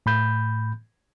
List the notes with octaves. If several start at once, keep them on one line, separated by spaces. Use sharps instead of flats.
A2 B5 G6